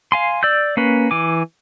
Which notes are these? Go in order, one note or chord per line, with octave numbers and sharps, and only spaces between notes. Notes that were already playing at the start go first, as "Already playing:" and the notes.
F5 G#5 C6
D5 E6 G6
A#3 C#4 B4
E3 G#5 D6